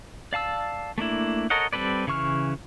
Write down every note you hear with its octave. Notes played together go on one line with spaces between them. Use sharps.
D5 F5 A5 E6
A3 A#3 D4 E4
A4 A#4 C#5 D#5 F#5
G3 C4 A4 B4 D5
C#3 E3 C#6 F6